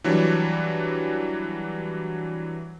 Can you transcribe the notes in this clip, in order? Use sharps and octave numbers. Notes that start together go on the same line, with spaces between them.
E3 F#3 G3 D4 C#5